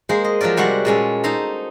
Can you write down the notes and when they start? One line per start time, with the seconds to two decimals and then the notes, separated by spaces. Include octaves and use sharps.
0.09 G#3 A#3 G#4 C5
0.24 D#5
0.41 F3 F#3 G4 A#4 D5
0.57 C3 G3 G#3 F#4 F#5
0.85 A#2 G#3 C#4 A4
1.24 D#4 A4 C5 A#5